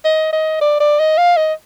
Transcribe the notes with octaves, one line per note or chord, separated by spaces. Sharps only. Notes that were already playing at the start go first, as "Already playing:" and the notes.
D#5
D#5
D5
D5
D#5
F5
D#5